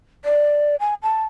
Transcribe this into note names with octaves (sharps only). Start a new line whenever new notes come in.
D5
G#5
A5